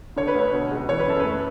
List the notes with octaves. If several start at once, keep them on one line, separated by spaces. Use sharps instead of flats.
D3 C#5
B4
D2 C#5
B2
C#2
E3 C#5
B4
F#2 A4
A3 B4